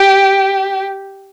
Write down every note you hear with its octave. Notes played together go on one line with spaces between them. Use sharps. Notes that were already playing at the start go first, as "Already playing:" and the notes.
Already playing: G4